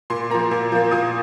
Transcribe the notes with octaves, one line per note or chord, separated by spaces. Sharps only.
A#2 C6
F3 A#3 A#5
A#2
F3 A#3
A#2 D#6